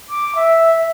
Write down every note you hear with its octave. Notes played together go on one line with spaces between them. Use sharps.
D6
E5